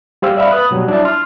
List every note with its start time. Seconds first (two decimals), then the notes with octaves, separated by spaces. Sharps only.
0.22 G3 G4 C5 F5 E6
0.37 D5 E5 F5 B5
0.51 B4 D#6 F#6
0.71 B2 F#3 G3
0.88 D4 E4 E5 A5
1.05 C6 F6